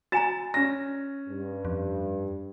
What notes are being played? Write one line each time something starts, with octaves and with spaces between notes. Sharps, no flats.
F#4 G#5 A#5 A6 E7
C#4 A#6
G2
F2